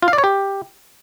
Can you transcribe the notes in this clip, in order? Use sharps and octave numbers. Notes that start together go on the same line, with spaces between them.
F4
F5
D5
C#5
G4